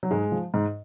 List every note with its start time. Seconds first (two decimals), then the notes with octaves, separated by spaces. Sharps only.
0.03 F#3
0.11 G#2 G#3
0.32 F3
0.54 G#2